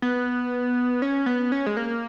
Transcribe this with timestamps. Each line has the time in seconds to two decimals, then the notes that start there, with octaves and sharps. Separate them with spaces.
0.02 B3
1.02 C#4
1.26 B3
1.52 C#4
1.66 G#3
1.77 A#3